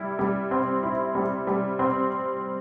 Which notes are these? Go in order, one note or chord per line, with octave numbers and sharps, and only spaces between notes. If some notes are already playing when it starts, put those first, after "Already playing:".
Already playing: G3 E4
G3
C4
E4
G3
G3
C4